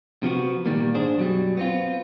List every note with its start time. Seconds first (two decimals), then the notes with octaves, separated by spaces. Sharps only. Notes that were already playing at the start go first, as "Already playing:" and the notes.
0.23 C3 F3 B3 F#4
0.66 A#2 D#3 G3 A#3
0.94 G#2 G#3 D4 G#4 C5
1.18 F#2 B2 F#3 G3
1.57 B3 C4 F4